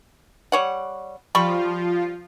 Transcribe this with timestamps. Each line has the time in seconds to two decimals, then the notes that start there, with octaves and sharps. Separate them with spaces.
0.52 G3 C#5 F#5
1.35 F3 G3 F4 B5 C#6